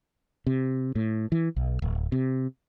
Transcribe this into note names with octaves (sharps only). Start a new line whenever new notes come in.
C3
A2
E3
B1
D1
C3